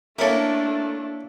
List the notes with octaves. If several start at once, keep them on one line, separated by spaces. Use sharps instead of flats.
A3 A#3 C#4 D4 E4 A4 A#4